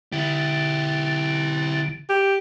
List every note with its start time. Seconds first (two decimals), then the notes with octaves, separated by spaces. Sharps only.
0.13 D3 E4 G4
2.10 G4